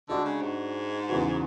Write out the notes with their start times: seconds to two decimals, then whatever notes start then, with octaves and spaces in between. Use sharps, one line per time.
0.09 D3 G#3 D4 F#4
0.25 C#3
0.42 G#2
1.09 E2 C#3 E3 B3 F#4